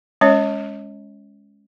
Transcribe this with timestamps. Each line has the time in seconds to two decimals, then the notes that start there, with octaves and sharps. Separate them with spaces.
0.21 G#3 C#4 C#5